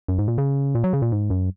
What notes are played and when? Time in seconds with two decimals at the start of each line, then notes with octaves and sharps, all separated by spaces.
0.08 F#2
0.18 G#2
0.28 A#2
0.38 C#3
0.75 A#2
0.84 F#3
0.93 C#3
1.02 A#2
1.12 G#2
1.30 F#2